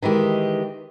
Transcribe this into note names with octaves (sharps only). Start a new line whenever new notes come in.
D#3 E3 G#3 G4